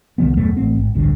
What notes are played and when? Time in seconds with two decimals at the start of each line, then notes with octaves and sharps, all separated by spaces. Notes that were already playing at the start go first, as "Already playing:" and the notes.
0.18 C2 D#3 F3 B3
0.37 D#1 F#2 B2 A3
0.57 A1 A3 C4
0.76 G#1
0.95 A1 D2 G2 D3